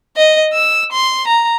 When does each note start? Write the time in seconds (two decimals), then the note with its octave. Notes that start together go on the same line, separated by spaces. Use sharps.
0.16 D#5
0.53 E6
0.92 C6
1.27 A#5